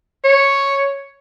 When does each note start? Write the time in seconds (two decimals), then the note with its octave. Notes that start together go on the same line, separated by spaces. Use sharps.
0.24 C#5